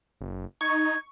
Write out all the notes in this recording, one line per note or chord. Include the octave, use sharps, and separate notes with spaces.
F#1
D#4 C#6 G#6